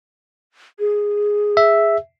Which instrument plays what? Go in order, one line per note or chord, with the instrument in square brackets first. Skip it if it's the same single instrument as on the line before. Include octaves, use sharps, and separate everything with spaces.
[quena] G#4
[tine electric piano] E5